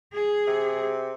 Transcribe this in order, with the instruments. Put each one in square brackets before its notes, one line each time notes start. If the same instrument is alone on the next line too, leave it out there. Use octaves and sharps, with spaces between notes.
[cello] G#4
[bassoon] C3